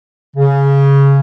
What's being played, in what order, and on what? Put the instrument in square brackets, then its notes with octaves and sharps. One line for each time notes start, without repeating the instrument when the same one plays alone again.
[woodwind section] C#3